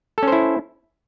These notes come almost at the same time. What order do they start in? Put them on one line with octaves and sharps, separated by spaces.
A4 C#4 C5 E4